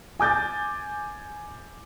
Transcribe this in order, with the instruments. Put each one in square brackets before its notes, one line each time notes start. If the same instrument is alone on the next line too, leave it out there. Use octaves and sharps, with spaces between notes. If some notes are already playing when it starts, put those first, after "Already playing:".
[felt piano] G#5 D6 G6 A6